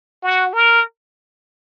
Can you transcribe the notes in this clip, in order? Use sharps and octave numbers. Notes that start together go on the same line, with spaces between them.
F#4
A#4